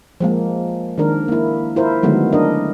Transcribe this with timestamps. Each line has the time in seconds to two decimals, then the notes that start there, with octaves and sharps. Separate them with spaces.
0.20 F3 G#3 A#3
0.98 D#3 G#3 D4 A#4
1.28 A#3 E4
1.76 E4 F4 A#4 C5
2.03 D3 D#3 F#3 G#3 A3 B3
2.33 D4 D#4 A#4 D#5